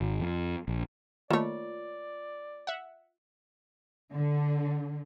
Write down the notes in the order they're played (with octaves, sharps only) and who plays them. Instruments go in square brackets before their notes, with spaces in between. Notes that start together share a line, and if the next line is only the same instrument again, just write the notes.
[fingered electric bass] G#1
F2
A#1
[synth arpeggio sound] D#3 A3 [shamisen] A#3 C#5 [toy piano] F4 [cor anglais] D5
[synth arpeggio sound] E5 F#5
[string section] D3